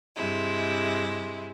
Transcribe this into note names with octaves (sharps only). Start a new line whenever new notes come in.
G2 C3 G#3 E4